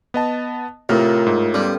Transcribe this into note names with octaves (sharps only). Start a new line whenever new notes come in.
B3 D#5 A5
A2 C3 F4 A#4 F6
G#2
G3 B3 C#4 A4